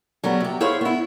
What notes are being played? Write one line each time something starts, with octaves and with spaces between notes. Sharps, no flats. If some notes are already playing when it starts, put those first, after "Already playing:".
F#3 G3 B3
C3 G4
E4 G#4 C5 C#5 F5
B3 E4